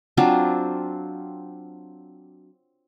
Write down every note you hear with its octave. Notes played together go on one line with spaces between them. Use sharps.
F#3 C4 D4 F4